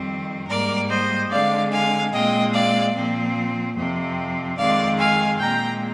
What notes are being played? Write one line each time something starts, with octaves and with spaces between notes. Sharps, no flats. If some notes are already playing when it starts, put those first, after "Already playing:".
Already playing: F2 D#3 G3 C4
G#2 G3 A#3 A#4 D5
C5 D#5
D3 G#3 C4 D5 F5
F5 G#5
A#2 G#3 C4 D#5 G5
D5 F5
A#2 F3 C4
F2 C3 F3 C4
F2 D#3 G#3 C4 D5 F5
F5 G#5
A#2 G#3 C4 G5 A#5